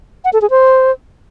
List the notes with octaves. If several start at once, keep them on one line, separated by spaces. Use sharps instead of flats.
F#5
A4
G#4
C5